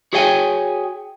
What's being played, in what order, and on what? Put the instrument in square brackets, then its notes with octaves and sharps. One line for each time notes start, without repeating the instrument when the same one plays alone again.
[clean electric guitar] F#4 G#4 C#5 F5 G5 G#5